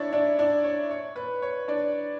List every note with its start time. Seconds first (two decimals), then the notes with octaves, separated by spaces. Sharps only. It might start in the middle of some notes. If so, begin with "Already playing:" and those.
Already playing: D4 E4 C#5 D5 E5
0.13 D4 D5
0.39 D4 D5
0.64 C#5
0.91 C#5
1.16 B4
1.42 C#5
1.68 D4 D5